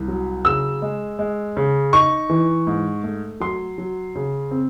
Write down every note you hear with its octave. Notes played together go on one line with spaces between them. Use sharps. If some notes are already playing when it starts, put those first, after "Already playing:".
Already playing: C2
F#3
C#3 E6
G#3
G#3
C#3
D#4 C#6
E3
G#2
A3
F#3 C6
F#3
C#3
C4